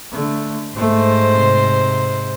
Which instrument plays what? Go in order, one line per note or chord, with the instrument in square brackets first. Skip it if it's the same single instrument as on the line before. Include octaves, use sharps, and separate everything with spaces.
[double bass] D3 A3
[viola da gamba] G#2 C5 [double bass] A3
[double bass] C3